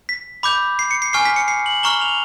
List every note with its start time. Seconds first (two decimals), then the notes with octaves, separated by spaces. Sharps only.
0.09 B6
0.43 B5 D6 G6
0.79 C7
0.91 C#7
1.02 C7
1.13 G#5 C#6 F6 C7
1.25 B6
1.36 C#7
1.48 C7
1.66 F#7
1.83 A#5 C#6 F6 G7
2.01 F7